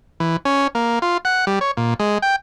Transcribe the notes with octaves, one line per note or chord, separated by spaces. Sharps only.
E3
C#4
A#3
F4
F#5
G3
C#5
A#2
G#3
G5